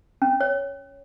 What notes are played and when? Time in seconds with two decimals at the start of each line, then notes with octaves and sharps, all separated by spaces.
0.22 C#4
0.41 C#5